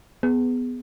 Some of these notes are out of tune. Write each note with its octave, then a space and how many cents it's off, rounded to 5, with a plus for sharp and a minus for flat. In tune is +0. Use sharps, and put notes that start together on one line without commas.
B3 +10 G#4 +0